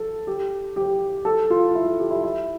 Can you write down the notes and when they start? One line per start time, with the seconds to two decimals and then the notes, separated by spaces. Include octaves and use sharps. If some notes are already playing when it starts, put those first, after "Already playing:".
Already playing: A4
0.27 G4
0.76 G4
1.25 A4
1.50 F4
1.75 E4
1.86 A4
1.99 G4
2.11 E4
2.23 E4